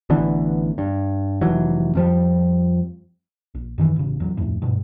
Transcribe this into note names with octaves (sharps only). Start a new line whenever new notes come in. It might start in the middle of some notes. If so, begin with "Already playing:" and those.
A1 D3 E3 B3
G2
F1 E3 F#3
F2 F3 G3
A#1
F#2 D#3 E3
A1 C#3
E2 F#3
D1 F2 A2
G2 B2